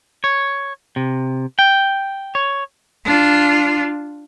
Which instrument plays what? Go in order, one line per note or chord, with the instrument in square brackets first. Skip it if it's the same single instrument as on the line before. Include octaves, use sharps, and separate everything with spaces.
[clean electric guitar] C#5
C3
G5
C#5
[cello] D4 F4